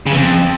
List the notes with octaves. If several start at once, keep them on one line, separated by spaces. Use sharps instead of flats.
C#3
E3
F2